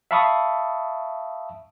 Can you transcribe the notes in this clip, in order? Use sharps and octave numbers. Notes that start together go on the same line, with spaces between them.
E5 F5 A5 B5 C#6 D#6